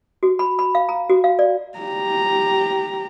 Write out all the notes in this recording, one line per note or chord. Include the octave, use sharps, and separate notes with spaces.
F#4
B5
B5
F5
A#5
F#4
F5
D5
G4 A#5